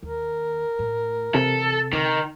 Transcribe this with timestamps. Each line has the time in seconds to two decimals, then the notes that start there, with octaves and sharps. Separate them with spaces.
0.03 D#2 A#4
0.79 A2
1.35 C3 E3 A4
1.93 D3 D#3